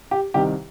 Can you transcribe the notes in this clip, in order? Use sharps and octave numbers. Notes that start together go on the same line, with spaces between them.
G4
C2 C3 D#3 G4